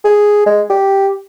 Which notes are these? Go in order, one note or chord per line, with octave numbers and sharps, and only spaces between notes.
G#4
G#3
G4